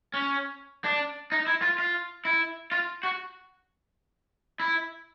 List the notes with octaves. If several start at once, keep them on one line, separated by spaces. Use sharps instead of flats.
C#4
D4
D#4
E4
F4
F4
E4
F4
F#4
E4